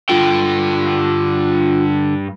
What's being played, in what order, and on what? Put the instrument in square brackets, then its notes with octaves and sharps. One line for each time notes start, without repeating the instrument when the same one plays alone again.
[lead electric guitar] G2 G5 [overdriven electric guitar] D3 [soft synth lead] F4